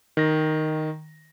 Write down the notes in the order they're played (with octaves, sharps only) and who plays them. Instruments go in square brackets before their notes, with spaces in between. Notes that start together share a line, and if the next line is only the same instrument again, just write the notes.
[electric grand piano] D#3 A#6